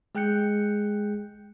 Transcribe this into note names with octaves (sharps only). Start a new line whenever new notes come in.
G#3 G#4 G5 F#6 G6 C#7